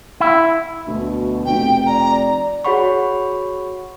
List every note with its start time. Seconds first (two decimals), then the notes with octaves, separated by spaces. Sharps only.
0.20 E4
0.87 D2 B2
1.45 F1 G5
1.86 D5 A#5
2.64 F#4 G#4 C#5 F#5 B5 C#6